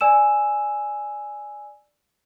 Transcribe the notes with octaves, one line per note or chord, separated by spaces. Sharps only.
D5 G#5 E6 E7